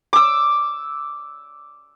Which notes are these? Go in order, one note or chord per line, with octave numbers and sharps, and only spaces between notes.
D6 E6